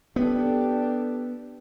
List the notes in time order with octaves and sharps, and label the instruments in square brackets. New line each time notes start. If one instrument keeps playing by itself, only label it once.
[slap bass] B3 [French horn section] D4 G4 A4